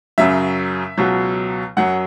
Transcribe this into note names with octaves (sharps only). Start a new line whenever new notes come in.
F#2 C#3 F#3 E5
C#2 B2 F#3
F#2 F#3 F#5